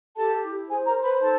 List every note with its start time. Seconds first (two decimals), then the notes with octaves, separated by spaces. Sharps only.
0.15 G4 A4 A5
0.43 E4
0.68 G#4 C5 G#5
0.86 A#4 A#5
0.95 C5
1.04 B4 B5
1.21 D#4 A4 A5